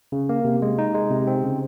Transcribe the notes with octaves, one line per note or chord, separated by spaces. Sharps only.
C#3
A#3
C3
G#3
D#4
G#3
C3
C4
C#3